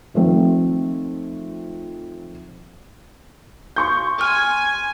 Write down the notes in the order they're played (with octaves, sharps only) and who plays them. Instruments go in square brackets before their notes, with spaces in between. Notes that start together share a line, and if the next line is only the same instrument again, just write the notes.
[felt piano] D#3 F3 A3 C4
[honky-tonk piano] C6 C#6 G6
[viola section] G#5 [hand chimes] F6